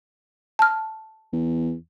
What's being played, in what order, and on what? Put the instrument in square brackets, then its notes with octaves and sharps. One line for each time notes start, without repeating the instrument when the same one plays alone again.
[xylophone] A5 F6
[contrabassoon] E2